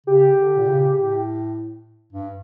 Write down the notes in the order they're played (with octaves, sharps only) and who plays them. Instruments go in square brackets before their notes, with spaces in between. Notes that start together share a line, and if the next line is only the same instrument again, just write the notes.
[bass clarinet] C#3 [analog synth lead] G4
[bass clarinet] D3
A#2
C#3
A2
G2